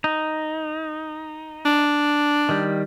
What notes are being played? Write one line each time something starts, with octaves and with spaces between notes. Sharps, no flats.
D#4
D4
D#3 G3